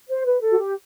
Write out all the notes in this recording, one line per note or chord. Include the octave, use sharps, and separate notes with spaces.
C5
B4
A4
F#4
G4